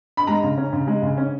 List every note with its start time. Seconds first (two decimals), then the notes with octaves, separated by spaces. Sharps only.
0.17 B5
0.27 G#3 A#5
0.43 C#3
0.58 C#4
0.73 C#3
0.87 G#3
1.02 C#3
1.18 C#4